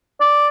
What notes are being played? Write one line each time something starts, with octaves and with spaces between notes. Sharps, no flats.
D5